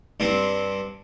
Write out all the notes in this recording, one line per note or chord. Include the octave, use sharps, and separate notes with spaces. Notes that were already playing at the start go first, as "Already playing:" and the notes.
G2 G3 C4